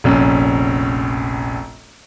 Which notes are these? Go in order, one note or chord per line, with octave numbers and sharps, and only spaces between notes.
F1 A#1 C#4